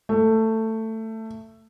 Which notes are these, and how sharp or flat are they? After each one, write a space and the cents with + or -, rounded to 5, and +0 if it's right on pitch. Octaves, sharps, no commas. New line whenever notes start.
A3 +15